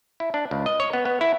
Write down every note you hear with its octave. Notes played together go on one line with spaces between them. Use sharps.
E4
D4
C#2
D#5
C#5
B3
B3
E4